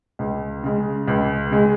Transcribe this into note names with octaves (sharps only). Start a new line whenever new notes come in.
C#2
C#3 G#3
C#2
C#3 G#3